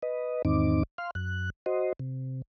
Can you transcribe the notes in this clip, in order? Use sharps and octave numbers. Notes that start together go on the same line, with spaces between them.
B4 D#5
E2 G#2 D#3 C4 D#4 D6
F5 C6 F6
F#2 F#6
F#4 C5 D#5
C3